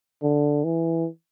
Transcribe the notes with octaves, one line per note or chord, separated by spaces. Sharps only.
D3
E3